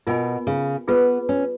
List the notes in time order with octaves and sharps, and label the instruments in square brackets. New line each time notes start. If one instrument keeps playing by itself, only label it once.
[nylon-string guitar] B2 [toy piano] F4 A#4 D#5 G#5 B5
[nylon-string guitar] C#3
[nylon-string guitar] B3 [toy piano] F4 G#4 B4
[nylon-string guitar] C#4